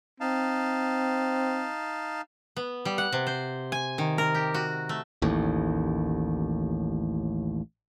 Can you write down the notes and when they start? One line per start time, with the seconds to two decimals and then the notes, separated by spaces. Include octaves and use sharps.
0.20 C4 D#4 F5 A5
2.56 B3
2.85 G3
2.98 F#5
3.12 C3
3.27 C5
3.72 G#5
3.98 D#3
4.18 A#4
4.35 G4
4.54 F#4
4.89 A3
5.22 A1 D#2 A2